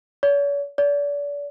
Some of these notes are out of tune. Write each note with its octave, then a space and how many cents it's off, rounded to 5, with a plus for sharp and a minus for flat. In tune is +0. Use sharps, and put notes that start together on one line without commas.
C#5 +45
D5 -35